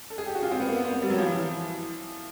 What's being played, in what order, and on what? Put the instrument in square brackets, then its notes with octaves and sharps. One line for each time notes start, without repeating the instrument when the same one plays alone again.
[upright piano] A4
G#4
G4
F#4
F4
C4
B3
A#3
B3
C4
B3
G3
F#3
F3
E3